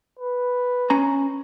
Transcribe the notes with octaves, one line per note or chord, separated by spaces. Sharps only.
B4
C#4 A#5